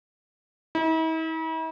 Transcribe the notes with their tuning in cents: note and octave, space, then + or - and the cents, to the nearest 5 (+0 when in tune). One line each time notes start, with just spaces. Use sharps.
E4 -45